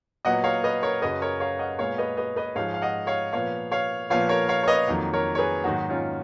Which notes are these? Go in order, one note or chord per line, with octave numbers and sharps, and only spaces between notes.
A#2 F#3 B3 D#5 F#5
C#5 F5
B4 D#5
A#4 C#5
F#2 C#3 F#3 B4 D#5
A#4 C#5
C#5 F5
D#5 F#5
A#2 G#3 B3 C#5 F5
B4 D#5
B4 D#5
B4 D#5
G#2 F3 G#3 C#5 F5
F5
D#5 F#5
C#5 F5
A#2 F3 B3 C#5 F5
C#5 F5
A#2 F3 B3 C#5 F5
A#4 C#5
C#5 F5
C#5
B4 D#5
F2 D#3 F#3 A#3
A#4 C#5
C#5
G#4 B4
G#2 D#3 F#3 A#3 D#4 F#4
C#4 F4